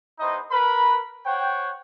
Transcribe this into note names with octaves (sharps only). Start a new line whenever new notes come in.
G#3 B3 D#4 E4 C5 D#5
A#4 B4 B5
C5 C#5 F#5 G5